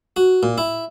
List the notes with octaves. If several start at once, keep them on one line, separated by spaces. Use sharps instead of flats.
F#4
A#2
E4